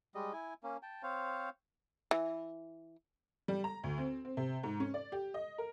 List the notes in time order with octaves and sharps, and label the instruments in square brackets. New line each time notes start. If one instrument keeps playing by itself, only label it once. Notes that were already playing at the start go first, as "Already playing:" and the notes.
[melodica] G3 G#3 D#5
E4 G#5
A#3 C#4
G5 A5
C4 C5 C#5 F5
[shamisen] E3
[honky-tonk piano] G3
A#5
D2
C4
C4
C3
G#2
C#4
D5
G4
D#5
A#4